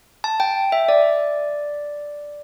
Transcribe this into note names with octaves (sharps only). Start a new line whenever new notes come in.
A5
G5
E5
D5